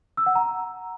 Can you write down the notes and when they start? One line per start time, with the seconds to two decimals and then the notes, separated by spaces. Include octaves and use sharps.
0.17 E6
0.26 F#5
0.35 A#5